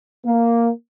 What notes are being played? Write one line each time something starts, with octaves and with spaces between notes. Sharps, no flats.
A#3